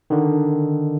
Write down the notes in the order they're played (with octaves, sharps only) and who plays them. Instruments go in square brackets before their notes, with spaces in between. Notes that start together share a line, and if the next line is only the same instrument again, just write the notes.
[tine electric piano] D3 D#3